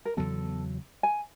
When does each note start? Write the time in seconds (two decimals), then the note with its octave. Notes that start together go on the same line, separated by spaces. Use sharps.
0.05 A#4
0.17 E2 C#3 F#3 B3 A4
1.03 G#5